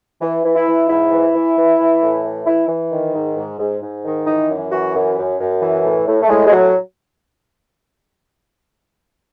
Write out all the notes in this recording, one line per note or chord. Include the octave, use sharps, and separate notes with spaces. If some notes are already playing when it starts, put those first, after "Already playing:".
E3
E3
E4
E3
G#2 E4
E3
E3
E3
E3
A2
E3
E3 E4
E3
D#3
G#2
G#2
G#2
G#2
D#3
E3 D#4
F#2
E3 F#4
F#2
F#2
F#2
E3
A2
A2
A3
A2 G#3
G#3
A2 F#3